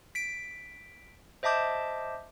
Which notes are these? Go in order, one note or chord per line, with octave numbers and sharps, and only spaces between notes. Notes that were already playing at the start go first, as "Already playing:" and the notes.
B6 D7
C5 D#5 E5 A5 D6 G6